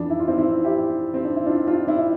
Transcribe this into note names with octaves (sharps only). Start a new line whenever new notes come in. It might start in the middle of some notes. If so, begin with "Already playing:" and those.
Already playing: F2 E3 D4
E4
F4
C4 E4
C4 E4
E4 G4
C4
D4
E4
D4 F4
D4 F4
C4 E4
E4